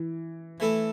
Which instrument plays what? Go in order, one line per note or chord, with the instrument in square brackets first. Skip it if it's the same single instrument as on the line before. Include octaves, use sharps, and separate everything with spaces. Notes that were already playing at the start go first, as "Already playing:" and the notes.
Already playing: [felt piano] E3
[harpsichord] E3 A3 E4 A4